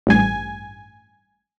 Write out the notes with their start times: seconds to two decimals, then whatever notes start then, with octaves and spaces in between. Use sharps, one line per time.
0.07 A1 G2 G#5